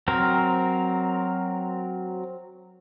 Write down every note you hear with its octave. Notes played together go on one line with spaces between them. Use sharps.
F#3 C4 A#4